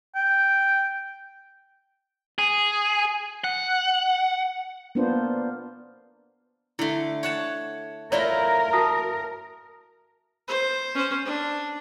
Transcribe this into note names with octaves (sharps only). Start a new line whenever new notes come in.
G5
G#4
F#5
A#3 B3 D4 F4 C5
D3 A3 E4
C#5 F#5 A5
A3 E4 F4 A#4 C#5 D5
F#4 A5 D#6
C5
C#4 C5
D4